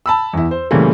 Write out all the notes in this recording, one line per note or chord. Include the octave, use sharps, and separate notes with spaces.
A5 B5 E6
E2 E4
C5
A#2 C#3 E3 G3 A3 A#3